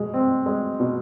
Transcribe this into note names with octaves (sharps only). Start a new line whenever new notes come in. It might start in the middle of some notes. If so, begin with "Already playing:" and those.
Already playing: B2 G#3
C4
G#3
B2